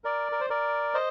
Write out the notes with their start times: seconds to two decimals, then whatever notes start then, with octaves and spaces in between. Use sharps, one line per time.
0.04 A#4 D5
0.32 A#4
0.41 C5
0.50 A#4 D5
0.94 C5 D#5